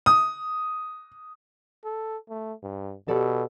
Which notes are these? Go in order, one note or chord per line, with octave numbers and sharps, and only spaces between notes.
D#6
A4
A3
G2
B2 G4 A4 D5